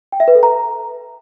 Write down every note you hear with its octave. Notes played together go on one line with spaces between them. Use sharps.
G5
E5
B4
A4
A#5